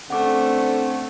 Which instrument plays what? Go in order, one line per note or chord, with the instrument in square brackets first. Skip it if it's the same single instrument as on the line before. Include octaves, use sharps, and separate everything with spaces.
[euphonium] D3 [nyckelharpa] A3 C#4 [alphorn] C4 [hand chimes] F#5 D6